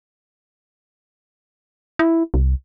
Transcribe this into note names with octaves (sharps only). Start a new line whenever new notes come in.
E4
C2